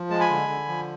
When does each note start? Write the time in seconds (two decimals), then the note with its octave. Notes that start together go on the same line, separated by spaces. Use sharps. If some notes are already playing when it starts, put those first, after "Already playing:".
Already playing: F3
0.10 G#3 A5
0.20 G#5 B5
0.30 D3
0.49 D3
0.68 F3